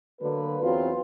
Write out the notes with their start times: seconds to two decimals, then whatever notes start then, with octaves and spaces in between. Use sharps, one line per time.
0.21 D3 F#3 A#3 B4
0.63 E2 F#3 C4 F4 B4